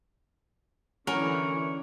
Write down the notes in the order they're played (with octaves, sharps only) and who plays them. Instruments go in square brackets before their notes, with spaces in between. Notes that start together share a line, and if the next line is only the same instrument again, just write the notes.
[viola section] D3 E3 [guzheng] F#3 C#4 [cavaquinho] A#4 [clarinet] C#6